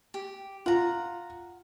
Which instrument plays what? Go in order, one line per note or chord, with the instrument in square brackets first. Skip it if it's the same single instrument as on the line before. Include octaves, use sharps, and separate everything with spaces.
[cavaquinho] G4
[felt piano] F4 [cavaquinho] F#5 A#5